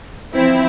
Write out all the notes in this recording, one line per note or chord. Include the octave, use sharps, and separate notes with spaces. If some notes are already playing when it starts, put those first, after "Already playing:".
F3 C4 E4